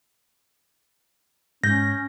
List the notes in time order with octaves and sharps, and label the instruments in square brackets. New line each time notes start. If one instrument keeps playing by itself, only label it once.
[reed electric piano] G#2 G6 [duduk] C#4 [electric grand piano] A#6